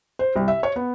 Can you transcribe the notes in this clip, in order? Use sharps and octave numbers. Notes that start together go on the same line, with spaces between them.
C5
C2
E5
C#5
B3